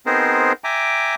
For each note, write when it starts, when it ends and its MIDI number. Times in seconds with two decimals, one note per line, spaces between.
0.06 0.53 59
0.06 0.53 60
0.06 0.53 63
0.06 0.53 68
0.06 0.53 70
0.06 0.53 72
0.64 1.15 76
0.64 1.15 79
0.64 1.15 80
0.64 1.15 82
0.64 1.15 86